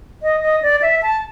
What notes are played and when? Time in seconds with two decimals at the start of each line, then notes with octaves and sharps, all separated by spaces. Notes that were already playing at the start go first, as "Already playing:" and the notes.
0.23 D#5
0.42 D#5
0.62 D5
0.82 E5
1.02 A5